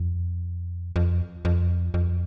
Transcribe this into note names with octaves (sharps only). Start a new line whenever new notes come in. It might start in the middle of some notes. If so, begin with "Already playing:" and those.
Already playing: F2
F2
F2
F2